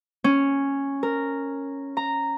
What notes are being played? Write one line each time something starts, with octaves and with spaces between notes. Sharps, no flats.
C#4
A#4
A#5